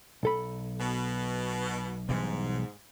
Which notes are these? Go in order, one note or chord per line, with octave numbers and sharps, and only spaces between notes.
B1 A4 B5
B2
G#2 B2 E3 G3